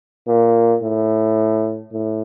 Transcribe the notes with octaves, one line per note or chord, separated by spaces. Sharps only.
A#2
A2
A2